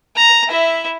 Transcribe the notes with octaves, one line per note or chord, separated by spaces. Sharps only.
A#5
E4 E5